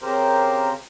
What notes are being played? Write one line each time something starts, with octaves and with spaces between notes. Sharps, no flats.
C#3 C4 G4 A#4 C5